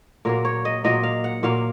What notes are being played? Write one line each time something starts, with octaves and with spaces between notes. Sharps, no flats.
A#2 F#3 A#3 A#4
C#5
D#5
A#2 F#3 A#3 D#5
F5
F#5
A#2 F#3 A#3 F5